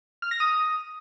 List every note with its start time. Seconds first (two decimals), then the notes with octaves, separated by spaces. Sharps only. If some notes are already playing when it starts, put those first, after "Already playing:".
0.22 F6
0.31 A#6
0.40 D#6